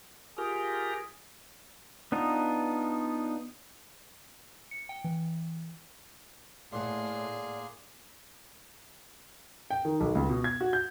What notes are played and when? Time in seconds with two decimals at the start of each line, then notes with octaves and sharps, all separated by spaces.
0.38 F4 G4 G#4 A#4
2.12 B3 D4 D#4 F4
4.71 C#7
4.89 G5
5.04 E3
6.72 A2 A#3 G#4 D5 F#5 C6
9.70 G5
9.85 D#3
10.00 B1
10.15 C#2
10.29 B2
10.44 G#6
10.61 F#4
10.73 G6